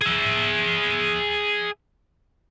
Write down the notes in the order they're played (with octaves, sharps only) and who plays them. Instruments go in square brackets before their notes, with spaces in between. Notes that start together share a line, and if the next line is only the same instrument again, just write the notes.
[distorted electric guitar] G#4 E5